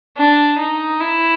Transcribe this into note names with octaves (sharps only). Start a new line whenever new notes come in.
D4
D#4
E4